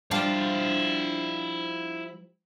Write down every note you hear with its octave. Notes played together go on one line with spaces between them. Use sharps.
F3 G3 D4 E4 F5